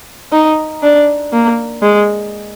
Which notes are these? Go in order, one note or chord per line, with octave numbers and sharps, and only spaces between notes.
D#4
D4
A#3
G#3